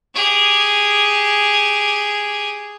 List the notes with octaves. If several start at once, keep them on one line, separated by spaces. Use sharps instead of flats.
G4 G#4